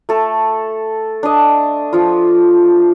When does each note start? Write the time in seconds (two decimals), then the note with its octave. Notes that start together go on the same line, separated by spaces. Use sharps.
0.09 A3 A4
1.23 D4 D#5
1.93 F3 F4